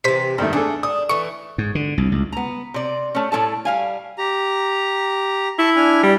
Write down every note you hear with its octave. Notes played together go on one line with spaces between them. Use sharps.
C3 E3 C5 B6
G2 D#3 A3 A4
A3 D4 G#4 A4
D4 D#6
E3 A3 C#6
G#2
D3
C2
C#2
B3 A#5
C3 D5
A3 C#4
A2 C#4 A4 A5
G3 F5 G#5
G4 A#5
E4 A5 C#6
D4 G#5 F6
G3